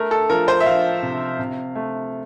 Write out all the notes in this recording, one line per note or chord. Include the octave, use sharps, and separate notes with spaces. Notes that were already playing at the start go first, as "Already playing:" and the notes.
Already playing: A3 A#4
A4
F3 A#4
C5
E5
F3 F5
C3
C3
A3